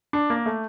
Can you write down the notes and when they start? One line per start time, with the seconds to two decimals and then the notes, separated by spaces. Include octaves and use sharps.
0.13 D4
0.30 A#3
0.46 A3